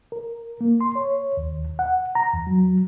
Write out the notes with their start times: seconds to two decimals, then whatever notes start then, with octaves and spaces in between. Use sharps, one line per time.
0.12 A#4
0.61 A#3
0.81 C6
0.95 C#5
1.37 D#2
1.79 F#5
2.15 A#5
2.33 E2
2.47 F#3